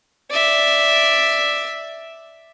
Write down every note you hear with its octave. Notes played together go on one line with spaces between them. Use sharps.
D5 E5